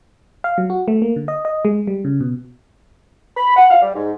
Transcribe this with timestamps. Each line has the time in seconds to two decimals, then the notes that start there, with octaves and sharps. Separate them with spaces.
0.44 F5
0.58 F#3
0.70 F#4
0.88 A3
1.02 A#3
1.16 D3
1.28 D#5
1.45 D#5
1.65 G#3
1.87 G3
2.05 C#3
2.21 B2
3.37 B5
3.56 F#5
3.70 F5
3.82 G3
3.94 G#2